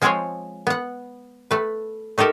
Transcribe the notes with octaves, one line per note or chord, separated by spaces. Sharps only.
F3 G#3 C4 G#4 C5 C#5
B3 F#5
A3 B4
A3 D#4 G4 A4 A#4